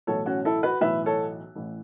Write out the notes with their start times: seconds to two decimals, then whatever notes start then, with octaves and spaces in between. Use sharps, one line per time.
0.07 B1 A2 E3 A4 C#5
0.26 C#4 F#4
0.45 E4 A4
0.63 F#4 B4
0.81 B1 A2 E3 B4 E5
1.06 A4 C#5
1.56 A1 A2 E3